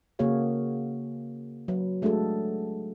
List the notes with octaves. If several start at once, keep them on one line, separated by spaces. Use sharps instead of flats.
C#3 A#3 F#4 G#4 C#5 F5
F#3 B4
G#3 A3 D4 F#4 G#4 A4